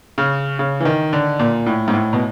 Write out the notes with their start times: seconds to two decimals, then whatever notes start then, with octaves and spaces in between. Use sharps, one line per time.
0.18 C#3
0.59 C#3
0.80 E3
0.85 D#3
1.13 D3
1.39 A#2
1.66 A2
1.88 G#2
1.94 A2
2.13 B2